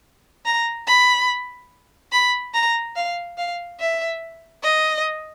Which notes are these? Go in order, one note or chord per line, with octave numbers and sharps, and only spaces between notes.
A#5
B5
B5
A#5
F5
F5
E5
D#5